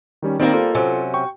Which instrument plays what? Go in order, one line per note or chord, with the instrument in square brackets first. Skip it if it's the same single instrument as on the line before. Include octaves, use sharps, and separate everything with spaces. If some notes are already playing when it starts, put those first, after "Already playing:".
[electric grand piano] D#3 G3 C#4
[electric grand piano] D#3 C4 D#4 [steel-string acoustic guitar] G3 A#3
[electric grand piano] F4 A4 C5
[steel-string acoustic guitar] C3 F#3 C#4
[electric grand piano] G5 C#6